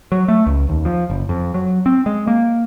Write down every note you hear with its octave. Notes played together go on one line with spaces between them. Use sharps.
F#3
A3
C#2
D#2
F3
F#1
F2
F#3
C4
G#3
A#3